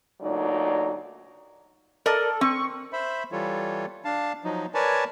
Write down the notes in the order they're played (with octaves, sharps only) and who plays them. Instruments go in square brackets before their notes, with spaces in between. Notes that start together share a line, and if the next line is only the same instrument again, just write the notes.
[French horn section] D2 A#2 F#3 D#4 D5
[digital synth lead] A4 [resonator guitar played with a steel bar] A#4 D5 D#5
[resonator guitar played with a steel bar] C4 [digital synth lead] C#6
[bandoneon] C5 E5 B5
E3 G3 F4 A4 C#5
D4 F5 A5
F3 F#3 D#4
A#4 B4 C#5 D5 G#5 A5